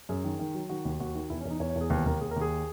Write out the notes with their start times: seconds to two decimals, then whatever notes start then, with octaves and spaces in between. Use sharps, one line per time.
0.09 F#2 G#4
0.24 D#3
0.39 D#3
0.55 F#3
0.69 D#3 F#4
0.85 D#2
1.00 D#2 F#4
1.15 D#3
1.30 E2 E4
1.40 C#4
1.45 E2 D#4
1.60 E2 C#5
1.70 C#5
1.76 E2
1.81 G#4
1.90 D#2 B4
2.06 D#2 A#4
2.21 D#2 G#4
2.31 A#4
2.36 D#2
2.41 G#4